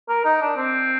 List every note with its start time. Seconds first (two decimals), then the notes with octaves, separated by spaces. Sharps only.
0.09 A#4
0.25 D#4
0.42 D4
0.57 C4